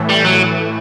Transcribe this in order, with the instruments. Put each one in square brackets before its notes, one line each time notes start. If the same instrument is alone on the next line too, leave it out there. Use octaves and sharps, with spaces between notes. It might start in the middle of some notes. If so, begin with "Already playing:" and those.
Already playing: [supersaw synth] A2 E3 A3
[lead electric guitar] G3
F#3